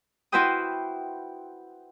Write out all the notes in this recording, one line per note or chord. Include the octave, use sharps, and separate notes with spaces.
E4 F#4 B4 C5 G5 D#6